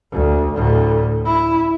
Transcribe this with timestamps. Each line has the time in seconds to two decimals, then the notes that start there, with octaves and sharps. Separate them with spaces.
0.13 D2
0.53 D2 A2
1.25 E4